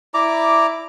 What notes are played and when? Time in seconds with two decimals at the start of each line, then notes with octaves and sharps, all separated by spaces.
0.14 E4 D5 A#5 D6